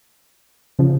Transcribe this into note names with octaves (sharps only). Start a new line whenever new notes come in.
C#3 F3